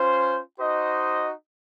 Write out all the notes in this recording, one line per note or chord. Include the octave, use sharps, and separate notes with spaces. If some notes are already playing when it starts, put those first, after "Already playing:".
Already playing: C#4 F4 C5
D#4 F#4 C5 D#5